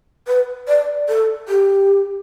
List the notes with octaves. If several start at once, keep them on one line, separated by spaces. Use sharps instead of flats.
B4
D5
A4
G4